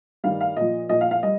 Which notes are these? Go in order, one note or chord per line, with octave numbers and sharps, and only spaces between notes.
G2 D#3 G3 F5
F5
A#2 F3 D#5
A#2 F3 D#5
F5
F5
G3 D#5